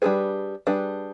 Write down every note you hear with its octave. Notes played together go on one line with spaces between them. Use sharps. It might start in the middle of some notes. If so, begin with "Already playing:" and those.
G3 D4 G#4 B4
G3 D4 G#4 B4